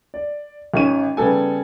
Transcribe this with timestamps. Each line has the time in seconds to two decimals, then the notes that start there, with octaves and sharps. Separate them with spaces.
0.14 D5
0.74 G#1 C#4 D#7
1.17 C#3 G3 B3 A4 G#5